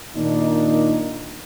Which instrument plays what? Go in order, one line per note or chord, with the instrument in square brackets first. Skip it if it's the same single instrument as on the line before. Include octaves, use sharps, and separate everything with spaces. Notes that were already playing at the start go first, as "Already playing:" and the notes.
[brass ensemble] A#2 D#3 A#3 D4 D#4